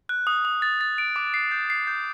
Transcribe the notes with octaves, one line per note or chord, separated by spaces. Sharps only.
F#6
D#6
D#6
A6
A6
D7
D6
C7
G6
C7
G6